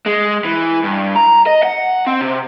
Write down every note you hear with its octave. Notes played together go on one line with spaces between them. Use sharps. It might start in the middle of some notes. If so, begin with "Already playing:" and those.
G#3
E3
G2
A#5
D#5
F#5
C4
C3